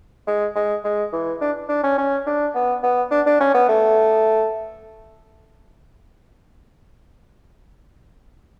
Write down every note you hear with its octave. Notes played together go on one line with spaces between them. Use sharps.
G#3
G#3
G#3
E3
D4
D4
C#4
C#4
D4
B3
B3
D4
D4
C#4
B3
A3